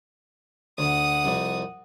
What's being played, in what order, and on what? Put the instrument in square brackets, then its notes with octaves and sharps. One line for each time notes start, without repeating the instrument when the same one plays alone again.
[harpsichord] D2 [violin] F#5 D#6
[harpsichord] C2 F2